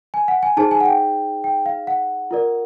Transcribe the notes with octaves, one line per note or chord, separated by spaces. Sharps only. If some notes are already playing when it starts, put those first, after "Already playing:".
G#5
F#5
G#5
D#4 G#4 C5 A5
G#5
F#5
G5
G5
F5
F#5
F4 A#4 D5